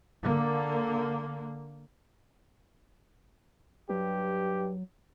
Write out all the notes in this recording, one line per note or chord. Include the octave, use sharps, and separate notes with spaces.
D3 A#3
G2 F#3 G4